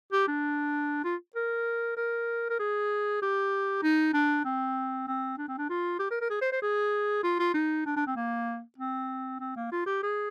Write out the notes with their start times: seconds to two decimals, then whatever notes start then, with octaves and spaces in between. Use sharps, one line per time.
0.12 G4
0.28 D4
1.04 F4
1.35 A#4
1.97 A#4
2.50 A#4
2.60 G#4
3.22 G4
3.83 D#4
4.13 D4
4.45 C4
5.07 C4
5.37 D4
5.48 C4
5.58 D4
5.70 F4
5.99 G4
6.11 A#4
6.21 A#4
6.30 G#4
6.41 C5
6.52 C5
6.62 G#4
7.23 F4
7.39 F4
7.54 D#4
7.86 D4
7.96 D4
8.07 C4
8.16 A#3
8.78 C4
9.40 C4
9.56 A#3
9.72 F4
9.86 G4
10.03 G#4